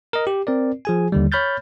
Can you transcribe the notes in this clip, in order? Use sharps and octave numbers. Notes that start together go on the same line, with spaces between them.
A#4 D#5
G4
C4 A#4 D5
F3 G#4 G#5
D#2 D3 G3
C#5 B5 F6 G6 A6